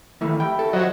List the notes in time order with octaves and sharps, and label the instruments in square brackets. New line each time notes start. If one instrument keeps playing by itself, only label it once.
[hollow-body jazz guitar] D#3 E3 A3 [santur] E4 F5 B5
[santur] G4 E5 [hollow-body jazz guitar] G5
[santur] F#4 G5 [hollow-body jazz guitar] A4
[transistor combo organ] F#3 [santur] F4 [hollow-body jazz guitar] C5 D#5